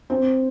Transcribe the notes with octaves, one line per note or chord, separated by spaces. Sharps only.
C4